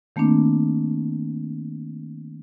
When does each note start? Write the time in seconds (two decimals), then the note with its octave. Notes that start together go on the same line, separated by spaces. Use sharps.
0.16 D#3 A3 A#3 C4 D4